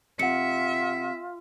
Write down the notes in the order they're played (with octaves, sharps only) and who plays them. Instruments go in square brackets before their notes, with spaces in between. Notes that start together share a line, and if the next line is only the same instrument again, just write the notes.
[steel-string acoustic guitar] C3 [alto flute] F4 [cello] E5 [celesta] F#5 C#7